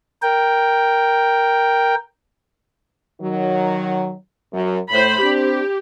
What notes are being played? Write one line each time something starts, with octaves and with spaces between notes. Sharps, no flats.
A#4 G5
D#3 F#3
F#2
A2 C5 B5
C4 D4 G4